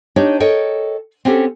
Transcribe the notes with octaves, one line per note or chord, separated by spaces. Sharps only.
D4 D#4 G4 C#5 D#5
A4 A#4 C#5 D#5 G5
C4 C#4 F#4 G4 A4